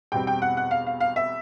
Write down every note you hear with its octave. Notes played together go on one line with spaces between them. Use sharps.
E2 B2 G3 C4 G5
G5
F#5
F#5
F5
F5
F5
E5